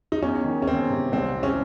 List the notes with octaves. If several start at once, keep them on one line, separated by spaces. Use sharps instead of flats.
D#4
E2 C#4
D#3
C#4
E2 C4
C3
C2 C4
E3
C#4